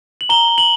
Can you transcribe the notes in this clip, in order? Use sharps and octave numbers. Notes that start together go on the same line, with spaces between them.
F#7
A#5 G7
A#5
F#7